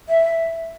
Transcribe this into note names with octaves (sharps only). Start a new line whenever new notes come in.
E5